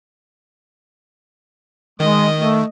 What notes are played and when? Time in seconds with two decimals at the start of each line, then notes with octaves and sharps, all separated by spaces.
2.00 D#3 G#3 D#5
2.37 A3